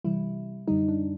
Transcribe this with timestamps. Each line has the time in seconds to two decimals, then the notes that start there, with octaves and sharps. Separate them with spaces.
0.04 C3 E3 G3 E4
0.68 F#2 D3 G3 D#4
0.88 D4